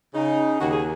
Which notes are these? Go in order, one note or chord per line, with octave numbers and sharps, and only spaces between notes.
C#3 D#4
D#2 F#4
G#4